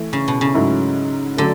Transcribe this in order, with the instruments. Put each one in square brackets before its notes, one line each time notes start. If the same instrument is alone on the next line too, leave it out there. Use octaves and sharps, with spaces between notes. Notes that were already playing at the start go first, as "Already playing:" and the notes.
Already playing: [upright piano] E3 A3
[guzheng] C#3
B2
C#3
[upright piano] G#2 F#3 A3 E4
[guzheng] D3 [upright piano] F#3 A3 D4